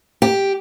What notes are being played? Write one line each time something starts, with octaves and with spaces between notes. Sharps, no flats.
G4